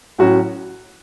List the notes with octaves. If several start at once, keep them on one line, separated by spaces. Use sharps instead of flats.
A2 F#3 C#4 F#4